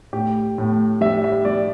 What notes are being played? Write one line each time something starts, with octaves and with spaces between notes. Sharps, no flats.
A2 G4
A2
G3 E5
E5
G3 D5